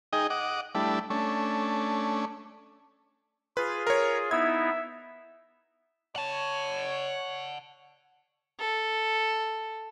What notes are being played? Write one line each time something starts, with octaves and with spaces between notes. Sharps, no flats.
D#4 G#4 D#5 G5
D#5 F#5 D6
G3 A3 D4 E4
A3 C#4 D4
F4 G#4 B4
A#4 C#5
B3 D#4 E4 E5 G#6
C#5 F#5 A5
A4